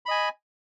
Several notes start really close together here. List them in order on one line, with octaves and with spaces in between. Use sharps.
B5 D#5 G#5